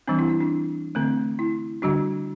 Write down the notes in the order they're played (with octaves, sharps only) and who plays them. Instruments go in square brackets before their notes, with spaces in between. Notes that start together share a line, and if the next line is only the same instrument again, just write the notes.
[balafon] E3 G3 C4 D4
E4
E4
D4
D3 A3 C4
E4
D3 G3 D4 F#4